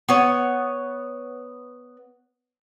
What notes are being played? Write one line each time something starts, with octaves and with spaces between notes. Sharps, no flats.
B3 C#5